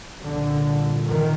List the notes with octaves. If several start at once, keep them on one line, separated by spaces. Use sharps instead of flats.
C2 A#2 D3
D#3